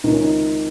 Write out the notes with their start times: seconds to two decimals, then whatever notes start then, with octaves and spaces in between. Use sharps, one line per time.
0.04 C#2 C3 D#3 D#4
0.14 C#4
0.23 D#4